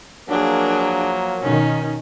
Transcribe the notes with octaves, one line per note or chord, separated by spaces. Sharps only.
F3 F#3 A#3 D4 G#4
B2 D#3 C#4 D#4